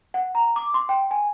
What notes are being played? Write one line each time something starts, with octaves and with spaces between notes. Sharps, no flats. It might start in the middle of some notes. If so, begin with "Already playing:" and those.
F#5
A#5
D6
C6
G5
G#5